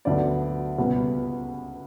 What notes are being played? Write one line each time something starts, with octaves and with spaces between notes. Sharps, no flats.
D2 D3 F#3 B3 D5
C#2 B2 G3 B3